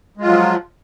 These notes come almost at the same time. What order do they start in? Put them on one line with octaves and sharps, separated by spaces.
G#3 F4 F#3 F3